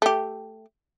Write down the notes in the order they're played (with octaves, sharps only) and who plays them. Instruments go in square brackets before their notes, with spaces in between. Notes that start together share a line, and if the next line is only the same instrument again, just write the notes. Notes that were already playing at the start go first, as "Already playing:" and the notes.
[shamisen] A3 G4